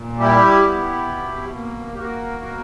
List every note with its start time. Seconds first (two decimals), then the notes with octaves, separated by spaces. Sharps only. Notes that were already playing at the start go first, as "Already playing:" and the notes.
Already playing: A#2
0.19 G3 E4 G4
0.64 B3
1.09 B2
1.53 A#3
1.95 G4
1.98 A#3 F#4 A#4
2.44 B2